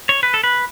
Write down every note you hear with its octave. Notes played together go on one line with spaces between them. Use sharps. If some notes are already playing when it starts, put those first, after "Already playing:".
C#5
B4
A4
B4